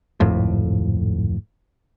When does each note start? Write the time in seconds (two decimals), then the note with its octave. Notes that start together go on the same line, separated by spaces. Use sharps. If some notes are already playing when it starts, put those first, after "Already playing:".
0.20 D1 G#1 F2 A2